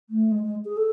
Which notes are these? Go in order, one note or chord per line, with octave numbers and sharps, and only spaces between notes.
A3
G#3
G#3
G#4
A4